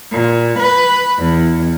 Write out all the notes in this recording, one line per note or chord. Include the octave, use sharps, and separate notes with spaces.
A#2
B4
E2